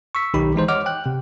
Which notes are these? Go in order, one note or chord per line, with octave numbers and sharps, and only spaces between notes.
C#6 E6 B6
B1 D#3 D#4 G4 B5
E3 G#3 D#4 C5
C#5 D#5 F#5 D6 F6
G5 F#6
C3